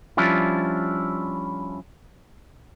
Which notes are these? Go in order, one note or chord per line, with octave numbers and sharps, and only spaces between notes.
F3 G3 C#4 D4 E4 F4